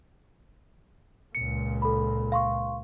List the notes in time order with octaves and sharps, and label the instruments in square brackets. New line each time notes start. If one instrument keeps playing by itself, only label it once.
[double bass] C#2 A#2 [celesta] C#7
[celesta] A4 B5
F5 C6 C#6